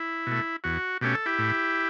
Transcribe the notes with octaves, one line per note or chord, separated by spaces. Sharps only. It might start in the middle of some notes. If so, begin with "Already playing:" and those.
Already playing: E4
B2 A3
E2 F#4
B2 A3 C#4 G4
A4
E4 G4
A2